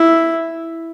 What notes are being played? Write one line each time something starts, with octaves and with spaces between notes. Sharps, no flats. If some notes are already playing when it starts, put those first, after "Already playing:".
Already playing: E4